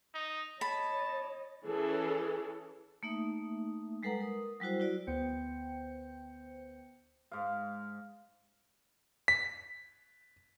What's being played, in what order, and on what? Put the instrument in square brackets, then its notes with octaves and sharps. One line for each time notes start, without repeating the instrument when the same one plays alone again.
[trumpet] D#4
[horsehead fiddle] C#5 D#5 [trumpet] A5 [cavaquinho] B5
[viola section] E3 C#4 G#4 A4
[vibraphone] A3 A#3 D#4 E5 D#6
G3 G#3 A4 B4 F#5 A#5
A#4 D#6
F#3 G3 E4 F#4 C5
E4 F#4 D5
[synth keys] D2 B3 C5 G5 G6 C#7
[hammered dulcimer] G#2 F5
[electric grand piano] B6